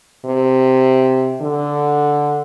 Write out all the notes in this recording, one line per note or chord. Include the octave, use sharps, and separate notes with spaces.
C3
D3